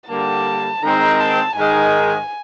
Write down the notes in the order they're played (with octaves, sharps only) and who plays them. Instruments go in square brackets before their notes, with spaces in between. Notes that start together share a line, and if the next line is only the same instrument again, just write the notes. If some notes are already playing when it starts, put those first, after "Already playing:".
[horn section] D3 G3 A#3 [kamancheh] A5
[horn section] D#3 G#3 C4 [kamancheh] A#5
[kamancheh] A5
[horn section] G#2 D#3 G#3 [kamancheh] G#5